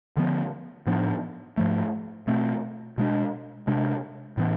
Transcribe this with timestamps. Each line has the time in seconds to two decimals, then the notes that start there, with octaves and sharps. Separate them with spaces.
0.17 D3 F3 B3
0.87 A2 F3 B3 D4
1.57 G#2 F3 A3
2.27 B2 A3 C4
2.98 B2 G#3 D4
3.67 C3 G#3 D4
4.37 A2 E3 B3